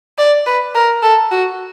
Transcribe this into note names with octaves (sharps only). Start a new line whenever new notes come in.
D5
B4
A#4
A4
F#4